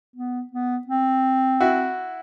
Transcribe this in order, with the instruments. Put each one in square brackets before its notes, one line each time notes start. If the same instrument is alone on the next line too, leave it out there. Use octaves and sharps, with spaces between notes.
[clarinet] B3
B3
C4
[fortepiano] E4 F#4